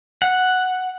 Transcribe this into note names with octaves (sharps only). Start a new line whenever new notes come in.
F#5